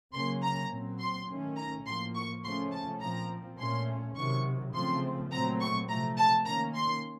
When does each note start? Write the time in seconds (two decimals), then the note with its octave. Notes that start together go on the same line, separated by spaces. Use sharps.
0.13 C#3 F#3 A#3 C#4 C6
0.43 A#5
0.71 A#2 F#3 C4
0.99 C6
1.28 D#3 A3 C#4
1.57 A#5
1.86 A2 F3 A#3 C6
2.15 C#6
2.44 C#3 F3 A3 C#4 C6
2.72 A5
3.01 A#2 F3 C4 A#5
3.59 A#2 A3 C#4 C6
4.16 C3 D#3 F#3 C#6
4.74 C#3 F3 A3 C4 C6
5.31 A#2 F#3 A3 C4 A#5
5.60 C#6
5.88 C3 F3 A3 A#5
6.17 A5
6.45 D#3 A#3 C#4 A#5
6.75 C6